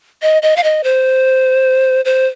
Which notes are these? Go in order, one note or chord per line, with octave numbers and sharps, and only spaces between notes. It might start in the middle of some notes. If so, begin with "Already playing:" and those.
D#5
D#5
F5
D#5
C5
C5